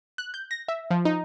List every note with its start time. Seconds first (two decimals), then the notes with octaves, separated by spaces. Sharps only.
0.18 F#6
0.34 G6
0.51 A#6
0.68 E5
0.91 F3
1.05 D#4